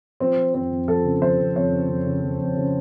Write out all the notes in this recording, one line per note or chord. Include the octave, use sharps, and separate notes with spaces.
F3 C4
F3
F2 C4
F2
F3 A4
C#3
F2 C5
F2
F2 C#5
C#3
F2
C#3
F2
F2
C#3